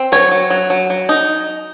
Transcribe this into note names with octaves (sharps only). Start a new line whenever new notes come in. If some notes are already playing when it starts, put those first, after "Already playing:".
Already playing: C4
F#3 C#5
F#3
F#3
F#3
F#3
D#4